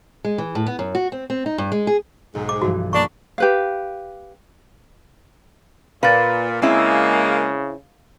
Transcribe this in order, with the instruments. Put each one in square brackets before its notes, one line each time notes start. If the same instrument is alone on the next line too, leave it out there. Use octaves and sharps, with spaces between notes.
[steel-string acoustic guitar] G#3
E3
A2
B3
F#2
F#4
C4
C4
D#4
G2
G#3
G#4
[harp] B1 [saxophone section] G#2
[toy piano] D6
[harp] G2 E3 F3 [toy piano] F#4
[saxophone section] A#2 D4 [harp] F3 B5 [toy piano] C#6
[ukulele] G4 B4 F5
[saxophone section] A#2 [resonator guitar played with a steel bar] B4 [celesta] F5 A6
[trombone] C#3 [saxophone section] G#3 A#3 [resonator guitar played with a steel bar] C4 E4